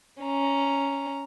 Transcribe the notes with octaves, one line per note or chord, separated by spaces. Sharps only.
C#4 A#5